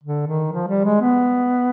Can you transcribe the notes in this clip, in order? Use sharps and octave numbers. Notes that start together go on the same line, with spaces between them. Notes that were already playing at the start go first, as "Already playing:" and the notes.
D3
D#3
F3
G3
G#3
B3